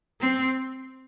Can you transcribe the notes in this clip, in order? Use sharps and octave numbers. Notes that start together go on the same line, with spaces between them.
C4